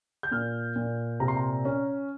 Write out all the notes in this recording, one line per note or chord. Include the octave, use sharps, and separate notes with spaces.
G6
A#2 F6
A#2
C3 A#5
C6
A#5
C#4